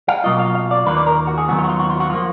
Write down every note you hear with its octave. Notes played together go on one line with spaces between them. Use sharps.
F5
B2 F#3 A#3 F4 D#5
F5
F5
D5
D#2 D#3 A#3 F4 B4
D5
A#4
F#4
G#4
D#2 D#3 F#3 B3 F#4
F4
F#4
F4
F#4
F4
F#4
F3 A#3 F4